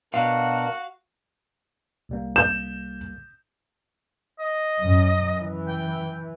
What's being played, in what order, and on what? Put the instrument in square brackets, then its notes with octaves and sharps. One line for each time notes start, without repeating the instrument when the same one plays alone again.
[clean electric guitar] B2 [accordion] D4 A#4 [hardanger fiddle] F#4 [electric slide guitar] F5
[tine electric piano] C2 G3 A#3
[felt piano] G6 [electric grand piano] E7
[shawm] D#5
[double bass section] F#2
E3
[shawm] G5